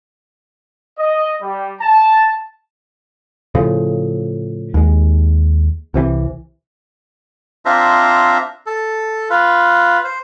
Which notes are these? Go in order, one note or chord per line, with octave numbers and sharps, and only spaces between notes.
D#5
G3
A5
A2 C#3 F3
D#2 G#3
C2 C3 E3
C4 D4 F4 C5 E5 A#5
A4
F4 B4
C5